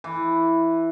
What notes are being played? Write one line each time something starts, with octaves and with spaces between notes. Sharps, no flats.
E3